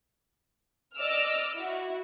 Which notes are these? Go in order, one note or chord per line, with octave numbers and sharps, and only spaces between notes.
D5 D#5 D6 E6 F6
E4 F#4